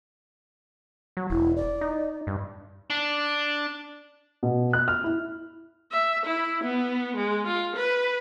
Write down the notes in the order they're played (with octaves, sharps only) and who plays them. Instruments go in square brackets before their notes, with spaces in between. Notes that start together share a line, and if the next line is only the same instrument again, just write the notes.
[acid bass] F#3
[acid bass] E1 [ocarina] E4
[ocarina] D5
[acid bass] D#4
G2
[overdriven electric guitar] D4
[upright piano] B2
F#6
F6
E4
[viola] E5
E4
B3
G#3
F4
B4